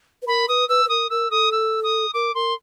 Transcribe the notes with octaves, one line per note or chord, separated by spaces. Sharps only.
B4
A#4 B5
B4 D#6
B4 E6
B4
A#4 D#6
A#4 E6
A4 D#6
E6
D#6
A#4 D6
A#4 C6